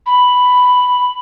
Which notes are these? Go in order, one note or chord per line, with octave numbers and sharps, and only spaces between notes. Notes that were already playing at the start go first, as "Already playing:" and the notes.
B5